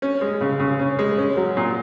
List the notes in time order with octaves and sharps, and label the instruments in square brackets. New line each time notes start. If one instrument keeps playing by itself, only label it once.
[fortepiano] C#4
G#3
C#3
C#3
C#4
G#3
C#4
F#3
A#2